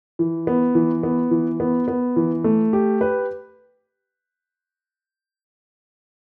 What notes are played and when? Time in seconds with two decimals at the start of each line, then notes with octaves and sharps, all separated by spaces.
0.19 E3
0.47 B3
0.75 E3
1.03 B3
1.31 E3
1.60 B3
1.88 B3
2.16 E3
2.44 A3
2.73 G4
3.01 B4